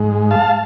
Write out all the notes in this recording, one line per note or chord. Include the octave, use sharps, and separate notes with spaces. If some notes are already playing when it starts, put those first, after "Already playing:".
Already playing: G#2 G#3
F5 A5